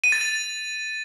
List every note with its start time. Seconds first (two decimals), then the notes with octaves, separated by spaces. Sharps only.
0.04 D#7
0.12 A6
0.21 D#7